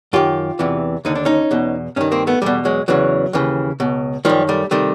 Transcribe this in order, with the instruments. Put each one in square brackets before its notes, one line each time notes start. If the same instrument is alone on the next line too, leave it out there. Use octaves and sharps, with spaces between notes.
[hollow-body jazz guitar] F#2 D#3 F4 G4
E2 C3 E3
D#2 D3 D#4
D4
C#4 D#4
E2 B2
G2 D#3 C#4 D#4
A#3 C4
A3 B3
E2 B2 G3 A3
F#3 G#3
E2 C#3 E3 F#3
D#2 C#3 E3
C#2 B2
F#2 D#3 F3 G3
G3 A3
C3 D#3 G3 A3